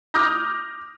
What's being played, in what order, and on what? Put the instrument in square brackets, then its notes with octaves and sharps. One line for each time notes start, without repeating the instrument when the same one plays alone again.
[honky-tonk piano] D6 D#6 F6 G6 A#6